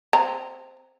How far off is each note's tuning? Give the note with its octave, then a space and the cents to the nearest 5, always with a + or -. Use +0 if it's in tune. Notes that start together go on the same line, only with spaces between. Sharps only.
C4 +0 A#5 +0